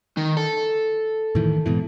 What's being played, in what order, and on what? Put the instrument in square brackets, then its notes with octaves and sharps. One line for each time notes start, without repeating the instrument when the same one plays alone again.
[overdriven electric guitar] D#3
A4
[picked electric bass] A2 D#3 E3
G#2 B2 E3